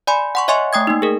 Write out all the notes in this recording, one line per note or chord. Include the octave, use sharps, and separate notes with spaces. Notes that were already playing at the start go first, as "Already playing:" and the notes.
D5 G#5 B5 C6
F#5 C6 C#6
C#5 D#5 E5 G#5 C6 C#6
A3 G5 D#6 G#6
A#3 D#4
G#4 A#4